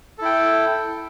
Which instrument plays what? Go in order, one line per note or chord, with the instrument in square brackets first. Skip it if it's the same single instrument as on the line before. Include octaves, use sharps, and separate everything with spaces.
[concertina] A4
E4
G5